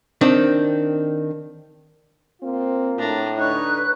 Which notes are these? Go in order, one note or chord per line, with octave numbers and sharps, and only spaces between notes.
D#3 C4 D4
A#3 C4 F4
A2 D4 A#5
D3 D#4 B4 C#5 F#6